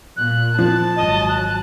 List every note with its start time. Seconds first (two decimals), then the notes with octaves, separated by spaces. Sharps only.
0.17 A#2 F#6
0.58 F3 A5
0.96 G#1 F#3 D#5
1.28 F#6